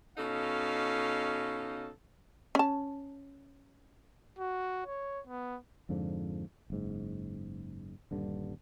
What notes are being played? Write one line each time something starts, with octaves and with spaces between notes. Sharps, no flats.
B2 C#4 D#4 A4 F5
C#4 A5
F#4
C#5
B3
F2 G#2 D3 F3
F#1 G#2
D#1 G2 D3